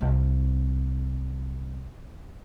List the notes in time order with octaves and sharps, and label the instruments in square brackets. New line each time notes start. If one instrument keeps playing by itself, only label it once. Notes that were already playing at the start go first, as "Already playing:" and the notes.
[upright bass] C2 C4